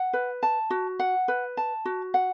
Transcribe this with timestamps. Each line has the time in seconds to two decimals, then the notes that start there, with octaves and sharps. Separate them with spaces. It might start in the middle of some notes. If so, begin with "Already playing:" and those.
Already playing: F#5
0.13 B4
0.43 A5
0.70 F#4
0.99 F#5
1.28 B4
1.57 A5
1.85 F#4
2.14 F#5